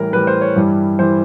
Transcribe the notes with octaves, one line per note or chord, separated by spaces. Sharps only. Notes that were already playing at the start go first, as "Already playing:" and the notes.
Already playing: A2 E3 G3 A#4
A2 E3 G3 B4
C5
C#5
G2 E3 G3
E3 G3 C5